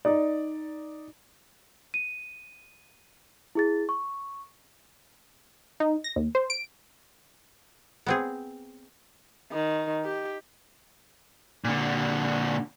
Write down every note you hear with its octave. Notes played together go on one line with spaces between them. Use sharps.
D#4 D5
D#7
E4 G#4 A6
C#6
D#4
A#6
D#2
C5
D7
B3 C4 G#4
D#3
G4
A#2 D3